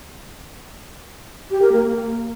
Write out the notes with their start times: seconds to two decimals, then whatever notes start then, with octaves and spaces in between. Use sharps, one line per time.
1.50 G4
1.61 A#4
1.72 A#3